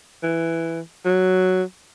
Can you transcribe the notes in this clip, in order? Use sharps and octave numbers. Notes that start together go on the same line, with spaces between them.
E3
F#3